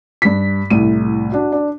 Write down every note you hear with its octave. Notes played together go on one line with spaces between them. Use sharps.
G2 B6
C2 A2 D#7
D4 F#4
D4